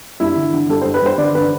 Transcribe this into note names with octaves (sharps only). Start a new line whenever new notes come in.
G2 E4
D3
D3
G2 A4
G2 C5
B4
G2 C5
D3 D5
D3 B4